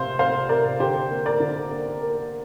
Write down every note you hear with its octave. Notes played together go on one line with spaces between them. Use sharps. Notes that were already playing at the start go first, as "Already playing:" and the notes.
Already playing: C3 A#3 C5 F5
C3 C5 F5
C3 A#4 D5
D3 G4 C5
A#3
A#4 D5
D3
A#3
A#3